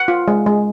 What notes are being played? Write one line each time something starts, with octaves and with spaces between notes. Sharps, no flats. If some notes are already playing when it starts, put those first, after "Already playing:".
Already playing: F#5
F4
G#3
G#3